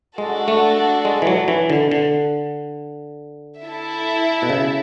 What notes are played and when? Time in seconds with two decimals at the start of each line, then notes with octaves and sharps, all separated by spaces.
0.18 G#3 D4 F#4 A4
0.48 A3
1.05 G#3
1.22 E3
1.27 F#3
1.48 E3
1.70 D3
1.91 D3
3.64 E4 A4 E5
4.42 B2
4.49 C#3